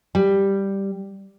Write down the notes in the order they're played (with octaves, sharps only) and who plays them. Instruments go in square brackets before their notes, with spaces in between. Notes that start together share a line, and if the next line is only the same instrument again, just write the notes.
[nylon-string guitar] G3